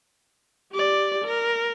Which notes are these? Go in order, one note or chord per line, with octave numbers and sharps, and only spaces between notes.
G4 D5
A#4